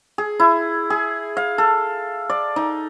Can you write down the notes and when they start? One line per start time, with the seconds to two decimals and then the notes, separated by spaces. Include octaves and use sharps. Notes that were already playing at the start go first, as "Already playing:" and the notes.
0.18 G#4
0.40 E4
0.90 G#4
1.37 F5
1.58 A4
2.30 D5
2.56 D#4